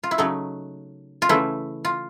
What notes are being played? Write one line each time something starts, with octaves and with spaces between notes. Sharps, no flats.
F4
E4
C#3 F#3 A3 D#4
F4
C#3 E3 A3 E4
F4